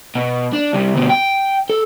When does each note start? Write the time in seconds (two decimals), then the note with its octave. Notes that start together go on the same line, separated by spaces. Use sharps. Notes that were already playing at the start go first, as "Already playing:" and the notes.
0.15 B2
0.53 D4
0.74 C2 C3
0.96 D2 B2
1.10 G5
1.70 A4